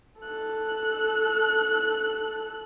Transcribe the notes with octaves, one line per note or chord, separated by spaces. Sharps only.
A4 F#6